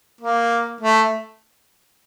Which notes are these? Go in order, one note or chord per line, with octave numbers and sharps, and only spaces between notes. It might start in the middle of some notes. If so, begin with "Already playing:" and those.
A#3
A3